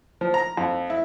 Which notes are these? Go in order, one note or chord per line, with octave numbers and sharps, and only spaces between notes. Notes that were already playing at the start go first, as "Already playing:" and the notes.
F3
A#5
F2
E4